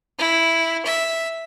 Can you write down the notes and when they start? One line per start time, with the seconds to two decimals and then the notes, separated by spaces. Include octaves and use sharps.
0.19 E4
0.85 E5